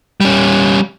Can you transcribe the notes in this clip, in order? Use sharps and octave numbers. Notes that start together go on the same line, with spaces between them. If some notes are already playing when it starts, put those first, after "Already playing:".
G3 C#4